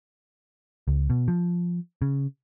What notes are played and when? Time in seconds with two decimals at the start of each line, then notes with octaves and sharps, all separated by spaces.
0.88 C#2
1.10 B2
1.28 F3
2.02 C#3